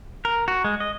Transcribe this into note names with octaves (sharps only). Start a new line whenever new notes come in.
A#4
F#4
G#3
D#5